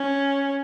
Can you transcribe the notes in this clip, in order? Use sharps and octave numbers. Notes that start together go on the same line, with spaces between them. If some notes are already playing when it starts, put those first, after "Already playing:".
Already playing: C#4